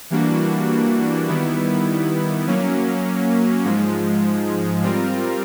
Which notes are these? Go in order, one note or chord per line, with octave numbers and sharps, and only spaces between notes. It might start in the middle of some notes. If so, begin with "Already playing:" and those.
E3 G3 A#3 D4 F#4
D#3 G3 B3 E4
F#3 A#3 C#4
G#2 F3 G#3
G3 C4 F4 A#4